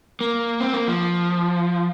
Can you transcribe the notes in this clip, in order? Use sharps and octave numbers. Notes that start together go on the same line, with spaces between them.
A#3
C4
A#3
F3